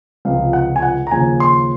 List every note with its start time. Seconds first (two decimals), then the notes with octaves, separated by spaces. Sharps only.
0.25 C#2 C3 F3 F5
0.53 F#5
0.76 G#5
0.82 F#5
1.07 A#5
1.11 D#2 C#3 F3 G#5
1.40 C6